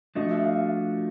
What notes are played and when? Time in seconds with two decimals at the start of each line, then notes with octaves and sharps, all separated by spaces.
0.15 F3 A3 D4 F#4 D#5
0.30 E5
0.44 F5
0.58 F5